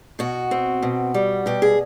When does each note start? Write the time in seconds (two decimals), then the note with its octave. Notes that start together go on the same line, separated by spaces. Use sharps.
0.19 B2 F#4
0.51 C4
0.82 B2
1.14 G3
1.46 B2 G4
1.62 G#4